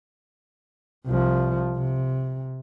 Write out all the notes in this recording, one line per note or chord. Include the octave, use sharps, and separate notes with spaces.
C2 F3
C3